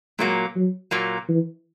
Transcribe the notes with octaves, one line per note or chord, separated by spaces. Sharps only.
A#2 F#3 G#3 A#3
F#3
A#2 F#3 A#3
E3